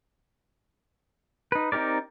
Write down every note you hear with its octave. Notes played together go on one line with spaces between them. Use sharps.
D#4 B4
C4 D#4 G4 A#4 D5